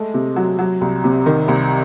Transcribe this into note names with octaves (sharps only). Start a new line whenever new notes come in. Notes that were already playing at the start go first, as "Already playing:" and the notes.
Already playing: G#3 A3
C3
F#3
F#3
C2
C3
D#3
C2